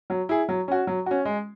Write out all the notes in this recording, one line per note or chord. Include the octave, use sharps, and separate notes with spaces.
F#3
E4 G#4
F#3
C#4 F#4
F#3
C#4 F#4
G#3